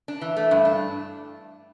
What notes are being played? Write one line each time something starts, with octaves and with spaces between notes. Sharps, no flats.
D4
E3
A3
G2
D4